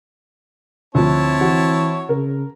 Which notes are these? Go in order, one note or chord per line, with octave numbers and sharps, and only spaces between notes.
D2 F3 C4 E4 C#5 A5
E3 F#4
C#3 A#4